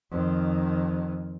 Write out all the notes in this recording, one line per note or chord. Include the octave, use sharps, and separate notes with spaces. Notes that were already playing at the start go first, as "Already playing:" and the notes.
F2 D#3